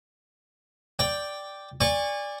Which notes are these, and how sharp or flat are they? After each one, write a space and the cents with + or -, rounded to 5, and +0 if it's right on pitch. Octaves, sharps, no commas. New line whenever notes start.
D5 +0 G5 +0
D5 +0 G#5 -30 C#6 +0